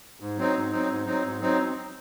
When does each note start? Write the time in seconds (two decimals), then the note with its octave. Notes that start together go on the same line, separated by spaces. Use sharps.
0.20 G#2
0.37 F#3 C4 D#4
0.54 G#2
0.71 F#3 C4 D#4
0.88 G#2
1.06 F#3 C4 D#4
1.23 G#2
1.41 F#3 C4 D#4